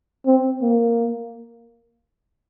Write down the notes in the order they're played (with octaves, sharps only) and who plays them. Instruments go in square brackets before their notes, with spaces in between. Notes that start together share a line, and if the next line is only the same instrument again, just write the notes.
[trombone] C4
A#3